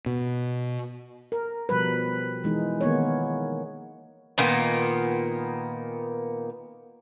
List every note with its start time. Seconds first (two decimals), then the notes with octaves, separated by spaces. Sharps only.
0.06 B2
1.32 A#4
1.69 B2 F3 G3 B4
2.44 E3 G#3 D#4
2.81 D#3 A#3 B3 C#5
4.38 A#2 D#3 A#3 B3